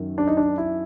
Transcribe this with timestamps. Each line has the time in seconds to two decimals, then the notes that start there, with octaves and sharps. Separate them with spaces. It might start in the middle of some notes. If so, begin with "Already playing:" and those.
Already playing: F#2 D#3 F#3
0.18 D4
0.27 D#4
0.37 D4
0.58 E4